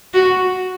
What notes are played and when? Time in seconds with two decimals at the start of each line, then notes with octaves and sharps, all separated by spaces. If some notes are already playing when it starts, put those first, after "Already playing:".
0.14 F#4